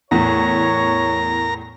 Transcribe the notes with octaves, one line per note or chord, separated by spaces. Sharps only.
E2 A2 A#4 C#5 A#5